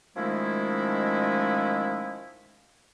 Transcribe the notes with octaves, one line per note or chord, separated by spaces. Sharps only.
D#3 F3 G#3 A3 C#4 E4